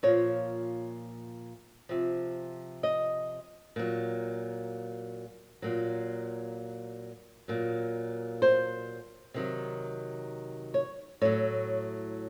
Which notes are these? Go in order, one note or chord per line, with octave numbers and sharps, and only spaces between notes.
A#2 F3 C#5
C3 F3
D#5
A#2 F#3
A#2 F#3
A#2 F#3
C5
C3 D#3 F#3
C#5
A2 F#3 C#5